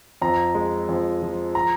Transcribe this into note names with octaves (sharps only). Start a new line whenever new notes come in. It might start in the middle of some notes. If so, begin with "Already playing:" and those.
F2 A#5
G#3
F2
F3
A#5